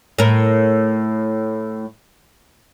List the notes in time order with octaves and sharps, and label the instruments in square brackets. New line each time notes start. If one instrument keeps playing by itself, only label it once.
[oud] A2 A#4